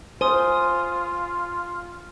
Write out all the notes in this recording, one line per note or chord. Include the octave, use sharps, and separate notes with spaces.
F4 C5 G#5 C6 D#6